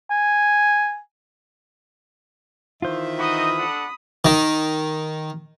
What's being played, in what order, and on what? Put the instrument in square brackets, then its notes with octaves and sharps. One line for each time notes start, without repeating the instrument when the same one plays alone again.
[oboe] G#5
[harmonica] D#3 E3 E5 [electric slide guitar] F4 C5
[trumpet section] D#4 F#4 D#5 [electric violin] B5 D#6
[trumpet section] D4 A4 F#5
[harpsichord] D#3